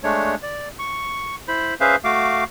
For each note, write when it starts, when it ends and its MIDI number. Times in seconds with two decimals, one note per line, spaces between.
0.04 0.35 56
0.04 0.35 57
0.04 0.35 62
0.04 0.35 73
0.43 0.69 74
0.79 1.35 85
1.48 1.74 64
1.48 1.74 72
1.48 1.74 83
1.81 1.96 61
1.81 1.96 68
1.81 1.96 71
1.81 1.96 72
1.81 1.96 76
1.81 1.96 77
2.04 2.44 57
2.04 2.44 66
2.04 2.44 77
2.04 2.44 86